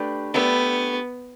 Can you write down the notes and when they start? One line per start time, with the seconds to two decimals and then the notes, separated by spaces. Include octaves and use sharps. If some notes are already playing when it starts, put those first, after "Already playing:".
Already playing: A3 D4 G4 B4
0.34 A3 B3 D4 G4 B4